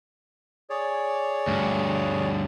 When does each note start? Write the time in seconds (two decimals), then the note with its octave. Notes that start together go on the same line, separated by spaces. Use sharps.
0.70 G#4 C#5 D5
1.47 D2 G2